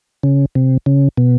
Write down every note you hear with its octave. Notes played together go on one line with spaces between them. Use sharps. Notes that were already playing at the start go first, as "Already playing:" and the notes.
C#3
C3
C#3
B2